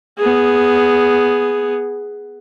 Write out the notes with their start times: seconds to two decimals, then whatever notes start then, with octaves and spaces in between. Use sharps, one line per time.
0.18 B3 G#4